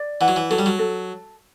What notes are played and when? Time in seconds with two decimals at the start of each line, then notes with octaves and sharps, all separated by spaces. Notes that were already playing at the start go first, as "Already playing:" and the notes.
Already playing: D5
0.21 E3 F#5
0.28 F#3
0.36 E3
0.50 F#3 A4
0.59 G3
0.66 F#3
0.79 A4